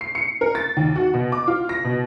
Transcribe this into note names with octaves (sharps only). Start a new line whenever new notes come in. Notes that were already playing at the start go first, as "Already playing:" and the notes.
C7
C#7
A#4
A6
D#2
F#4
B2
D6
F4
A#6
B2